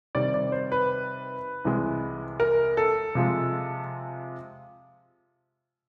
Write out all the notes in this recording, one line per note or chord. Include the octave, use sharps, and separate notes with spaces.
C3 D#3 G3 C4 D5
D5
C5
B4
C2 C3 E3 G#3
A#4
A4
C3 F3 G#3